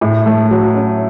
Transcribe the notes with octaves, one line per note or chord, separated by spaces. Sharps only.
A2
A3
F#3
C#4